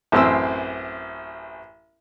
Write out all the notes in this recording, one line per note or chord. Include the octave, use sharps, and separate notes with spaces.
A1 F#2 C4 C5 E6